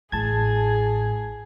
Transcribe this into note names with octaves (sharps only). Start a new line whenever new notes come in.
A1 A2 G#4 A5 G#6